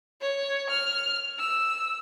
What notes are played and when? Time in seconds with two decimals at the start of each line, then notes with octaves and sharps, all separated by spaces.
0.21 C#5
0.70 F6
1.39 E6